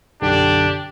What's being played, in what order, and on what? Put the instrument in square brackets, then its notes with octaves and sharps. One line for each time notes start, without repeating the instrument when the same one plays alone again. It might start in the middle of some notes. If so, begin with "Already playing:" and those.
[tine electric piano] B1 F#2 D3 [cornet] D4 [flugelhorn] G4